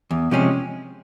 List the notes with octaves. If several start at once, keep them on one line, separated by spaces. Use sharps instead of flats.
E2
C3 F3 G#3 C#4